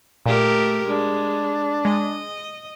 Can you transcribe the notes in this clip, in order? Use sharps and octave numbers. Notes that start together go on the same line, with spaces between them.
A#2 A3 G4 A#4
G#3 D4
G#3 D#5